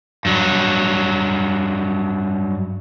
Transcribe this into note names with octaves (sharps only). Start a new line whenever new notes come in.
G2 F#3